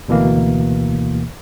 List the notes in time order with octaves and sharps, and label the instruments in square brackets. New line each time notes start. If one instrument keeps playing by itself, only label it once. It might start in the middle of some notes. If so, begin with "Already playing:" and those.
[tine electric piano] D2 B2 E3 A#3